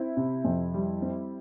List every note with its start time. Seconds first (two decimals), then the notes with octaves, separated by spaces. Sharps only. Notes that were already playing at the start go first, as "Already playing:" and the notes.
Already playing: C4 E4
0.17 C3
0.45 F2
0.74 G3
1.02 C4